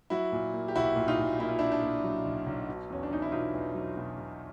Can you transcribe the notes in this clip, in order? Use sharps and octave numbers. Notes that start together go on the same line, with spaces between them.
F#3 E4 F#4
A#2
A#3
G4
B1 E4 F#4
A#2
D#4 F4
A#2
A#3 E4
F4
D4 E4
A#3
D4
A#2
F#3
B1
B1
B2
E2 C#4
D4
E2 D#4
E4
B2 D#4 F4
E2
F#3
B2
B2